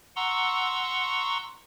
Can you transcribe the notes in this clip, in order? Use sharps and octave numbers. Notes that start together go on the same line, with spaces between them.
F#5 A#5 C6 C#6 E6